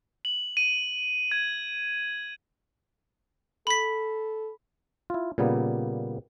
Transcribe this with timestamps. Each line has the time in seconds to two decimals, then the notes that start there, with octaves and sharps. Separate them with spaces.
0.25 F#7
0.57 D#7
1.32 G#6
3.67 A4 B5 B6
5.10 E4 F4
5.38 A#2 C#3 G3 A#3 B3